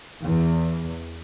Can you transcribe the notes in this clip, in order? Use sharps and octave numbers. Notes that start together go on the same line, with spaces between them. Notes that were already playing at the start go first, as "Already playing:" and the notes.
E2